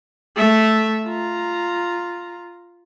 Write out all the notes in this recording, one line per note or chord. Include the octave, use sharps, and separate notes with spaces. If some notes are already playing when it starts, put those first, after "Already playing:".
A3 E5
F4 A#5